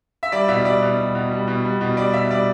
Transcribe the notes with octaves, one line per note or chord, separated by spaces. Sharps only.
E5
G3 D5
B2 E5
G3 D5
B2
G3
B2
G3
B2
G3
B2
G3 D5
B2 E5
G3 D5